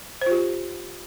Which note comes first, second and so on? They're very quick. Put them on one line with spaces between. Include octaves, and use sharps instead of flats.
C5 F4 G4